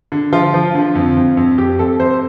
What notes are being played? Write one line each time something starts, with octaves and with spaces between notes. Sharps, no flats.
D3
F3 F4
F3
D3
F2
F2
F2
F2 G4
F2 A4
F2 C5